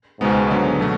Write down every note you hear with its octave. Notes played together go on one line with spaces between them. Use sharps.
C#2 G#2 B2 G#3 B3
G#2 D3 F#3 B3
B2 F#3 A3